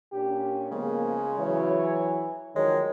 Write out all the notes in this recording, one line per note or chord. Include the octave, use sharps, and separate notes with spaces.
A#2 C#4 D4 G4
C#3 F3 G#3 A#3 B3
E3 F#3 C#5
D2 D#3 F3 F#3 G#3 C#5